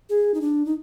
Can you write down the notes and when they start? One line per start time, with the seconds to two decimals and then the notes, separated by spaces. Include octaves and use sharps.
0.09 G#4
0.34 D#4
0.41 D4
0.66 D#4